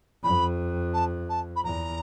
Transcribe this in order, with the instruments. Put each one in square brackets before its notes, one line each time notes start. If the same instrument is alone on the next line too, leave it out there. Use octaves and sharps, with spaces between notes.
[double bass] F2 [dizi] B5
[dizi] A5
A5
B5
[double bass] E2 [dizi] A#5